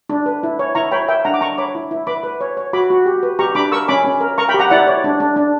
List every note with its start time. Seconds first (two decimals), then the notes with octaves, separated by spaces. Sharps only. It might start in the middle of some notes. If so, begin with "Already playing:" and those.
0.09 D4
0.26 B4
0.43 E4
0.59 C#5
0.75 E4 A#5 C#6
0.92 C#5 G5 B5
1.08 A#4 E5 G5
1.25 D4 F#5 A#5
1.34 D6
1.41 D4 A#5 C#6
1.58 C#5 B5 D6
1.75 E4
1.91 E4
2.07 B4 B5 D6
2.23 B4
2.41 C#5
2.57 C#5
2.73 F#4 B5 D6
2.90 F#4
3.06 G4
3.23 B4
3.39 G4 A#5 C#6
3.55 D4 B5 D6
3.72 A#4 C#6 E6
3.88 C#4 B5 D6
4.04 C#4
4.21 A#4
4.38 A#4 A#5 C#6
4.49 G5 B5
4.54 G4
4.59 F#5 A#5
4.70 E4 D5 F#5
4.87 C#5 D5
5.04 D4
5.20 D4
5.36 D4